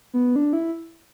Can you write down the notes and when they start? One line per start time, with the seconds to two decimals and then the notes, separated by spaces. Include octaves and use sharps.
0.14 B3
0.36 D4
0.53 E4